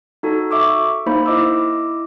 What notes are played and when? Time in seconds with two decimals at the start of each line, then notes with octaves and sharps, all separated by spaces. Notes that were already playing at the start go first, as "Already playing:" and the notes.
0.23 D#4 F#4 A4
0.51 E5 C#6 D6 E6
1.06 A#3 D#4 C5 B5
1.26 E4 D#5 D6 E6